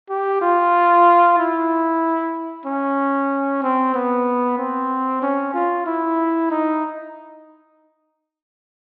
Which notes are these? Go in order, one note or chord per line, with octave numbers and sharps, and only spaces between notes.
G4
F4
E4
C#4
C4
B3
C4
C#4
F4
E4
D#4